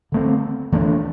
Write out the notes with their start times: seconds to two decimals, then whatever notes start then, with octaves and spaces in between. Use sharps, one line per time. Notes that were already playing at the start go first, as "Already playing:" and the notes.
0.12 D3 A3 C4
0.72 E3 A3 D4